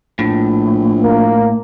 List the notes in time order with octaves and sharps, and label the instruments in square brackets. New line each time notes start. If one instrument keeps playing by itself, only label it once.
[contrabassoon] A#1 [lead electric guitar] A2
[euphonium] A#3